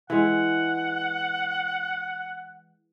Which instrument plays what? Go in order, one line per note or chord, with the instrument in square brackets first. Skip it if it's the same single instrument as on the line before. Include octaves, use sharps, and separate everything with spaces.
[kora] E3 G#3 [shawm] F#5